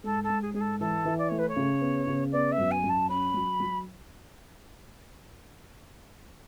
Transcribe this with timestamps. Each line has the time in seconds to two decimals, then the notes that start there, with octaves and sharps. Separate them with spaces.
0.04 G#2 A4
0.23 A4
0.29 G#2
0.42 G#4
0.54 G#2 G#4
0.61 A4
0.80 E3 A4
1.05 E3
1.18 D5
1.29 A3 C#5
1.38 B4
1.49 C#5
1.56 C#3
1.81 B3
2.07 C#3
2.32 B3 D5
2.52 E5
2.58 F#2
2.71 G#5
2.83 F#2
2.89 A5
3.09 C#4 B5
3.34 F#3
3.60 F#3